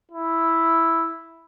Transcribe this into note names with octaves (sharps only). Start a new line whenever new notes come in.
E4